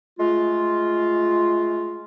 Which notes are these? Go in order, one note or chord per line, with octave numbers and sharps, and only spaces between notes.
G#3 A3 F4